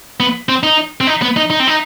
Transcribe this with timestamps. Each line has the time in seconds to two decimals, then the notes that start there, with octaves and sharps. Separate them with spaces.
0.20 B3
0.49 C4
0.63 D#4
1.01 C4
1.07 D#4
1.22 B3
1.36 D#4
1.50 D#4
1.60 C4
1.67 D#4